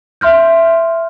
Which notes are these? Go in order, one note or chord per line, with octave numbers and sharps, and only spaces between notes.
E5 C6 F6 G6